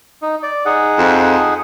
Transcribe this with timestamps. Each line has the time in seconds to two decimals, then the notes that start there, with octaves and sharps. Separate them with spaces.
0.22 D#4
0.43 D5
0.66 D#4 G#4 F#5
0.98 F2